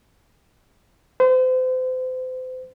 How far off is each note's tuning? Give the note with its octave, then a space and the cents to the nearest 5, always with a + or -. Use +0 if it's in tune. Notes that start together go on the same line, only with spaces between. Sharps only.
C5 -35